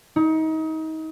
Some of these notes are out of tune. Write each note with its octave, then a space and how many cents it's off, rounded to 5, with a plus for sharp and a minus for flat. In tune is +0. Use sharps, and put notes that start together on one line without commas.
D#4 +30